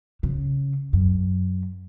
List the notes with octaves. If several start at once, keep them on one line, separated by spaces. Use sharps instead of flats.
C#3
F#2